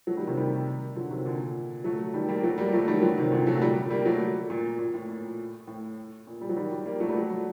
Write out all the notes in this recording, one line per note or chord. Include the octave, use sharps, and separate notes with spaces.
F#3 A3
D#3 G3
C3 D#3
D#3 G3
D3 F#3
C3 D#3
A#2 D3
F#3 A3
D#3 G3
G3 A#3
F#3 A3
G3 A#3
F#3 A3
D#3 G3
D3 F#3
C3 D#3
A#2 D3
F#3 A3
D#3 G3
G3 A#3
F#3 A3
A#2
A#2
A2
A#2
A2
A#2
G3
F#3
D#3 G3
G3 A#3
F#3 A3
G3
F#3 A3